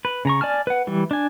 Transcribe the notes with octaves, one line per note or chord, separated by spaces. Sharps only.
B4
C#3 A#5 C#6
D5 G#5 A5 F6
B4 F#5
E3 G3
D4 G#5